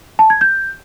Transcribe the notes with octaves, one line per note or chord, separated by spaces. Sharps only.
A5
G#6
G6